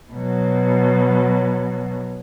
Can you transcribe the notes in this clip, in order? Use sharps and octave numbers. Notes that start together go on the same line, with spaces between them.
B2 F#3